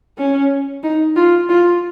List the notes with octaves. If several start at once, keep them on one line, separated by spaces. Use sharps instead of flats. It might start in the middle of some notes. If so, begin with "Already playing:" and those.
C#4
D#4
F4
F4